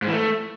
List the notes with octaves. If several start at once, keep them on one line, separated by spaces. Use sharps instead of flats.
G#2
E3
A3